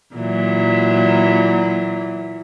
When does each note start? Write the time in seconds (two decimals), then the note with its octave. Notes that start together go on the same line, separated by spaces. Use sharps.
0.15 A#2 E3 F#3